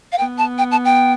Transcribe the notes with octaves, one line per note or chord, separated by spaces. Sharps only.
F5
B3 G5
A5
G5
A5
G5